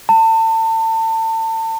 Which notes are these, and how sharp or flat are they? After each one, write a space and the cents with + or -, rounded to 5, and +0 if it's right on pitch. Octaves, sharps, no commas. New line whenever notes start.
A5 +30